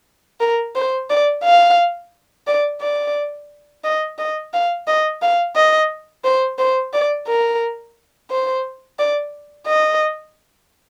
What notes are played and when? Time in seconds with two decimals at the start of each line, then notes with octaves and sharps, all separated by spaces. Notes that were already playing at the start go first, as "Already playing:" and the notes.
0.40 A#4
0.75 C5
1.10 D5
1.44 F5
2.47 D5
2.81 D5
3.84 D#5
4.18 D#5
4.53 F5
4.87 D#5
5.22 F5
5.56 D#5
6.24 C5
6.58 C5
6.93 D5
7.27 A#4
8.31 C5
8.99 D5
9.67 D#5